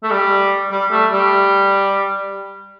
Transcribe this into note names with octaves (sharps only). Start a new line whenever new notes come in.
A3
G3
G3
A3
G3